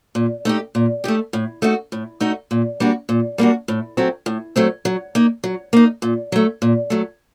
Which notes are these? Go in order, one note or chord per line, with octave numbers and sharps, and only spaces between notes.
A#2
A3 D#4 G4
A#2
A3 D#4 G4
A2
A3 D#4 F#4
A2
A3 D#4 F#4
A#2
G3 A#3 D4 F#4
A#2
G3 A#3 D4 F#4
A2
F#3 A3 C4
A2
F#3 A3 C4
F#3
A#3 D#4
F#3
A#3 D#4
A#2
F#3 A3
A#2
F#3 A3